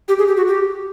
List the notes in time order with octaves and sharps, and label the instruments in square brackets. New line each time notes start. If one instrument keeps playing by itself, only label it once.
[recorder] G4
G#4
G4
F#4
G4